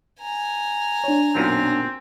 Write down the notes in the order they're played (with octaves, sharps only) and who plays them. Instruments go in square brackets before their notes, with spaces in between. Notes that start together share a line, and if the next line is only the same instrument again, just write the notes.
[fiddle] G#5 A#5
[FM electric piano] D4 C#5
[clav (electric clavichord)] B1 F#2 A#2 [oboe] C4